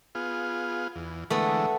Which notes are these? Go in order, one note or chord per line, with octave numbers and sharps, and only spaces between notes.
B3 F4 G#4
E2
D3 E3 G#3 A3 B3